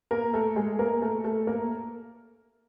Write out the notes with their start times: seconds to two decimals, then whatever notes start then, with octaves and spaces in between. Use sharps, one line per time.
0.11 A#3 A#4
0.33 A3 A4
0.56 G#3 G#4
0.79 A#3 A#4
1.02 A3 A4
1.24 A3 A4
1.47 A#3 A#4